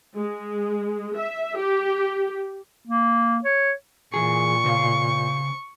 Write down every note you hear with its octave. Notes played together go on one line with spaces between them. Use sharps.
G#3
E5
G4
A#3
C#5
A#2 E3 G#4 C#6
C#3 C5 F5